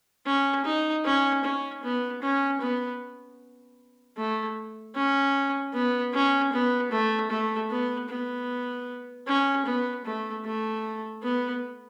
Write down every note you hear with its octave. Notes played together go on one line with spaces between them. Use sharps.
C#4
D#4
C#4
C#4
B3
C#4
B3
A3
C#4
B3
C#4
B3
A3
A3
B3
B3
C#4
B3
A3
A3
B3